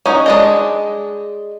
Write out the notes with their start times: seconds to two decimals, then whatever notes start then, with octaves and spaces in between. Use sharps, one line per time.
0.06 C#4 D#4 F#4
0.26 G#3 D4 D#5